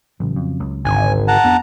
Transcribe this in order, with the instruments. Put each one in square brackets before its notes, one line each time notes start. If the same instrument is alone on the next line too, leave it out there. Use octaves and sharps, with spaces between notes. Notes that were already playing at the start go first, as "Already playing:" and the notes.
[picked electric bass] A1 [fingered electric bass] C#3 F#3
[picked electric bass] F2
C#2
[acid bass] G#1 [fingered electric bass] D2 G#2 D3 [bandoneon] G#5
[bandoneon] F#5 A5 A#5
[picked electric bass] F2 B3 [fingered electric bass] D4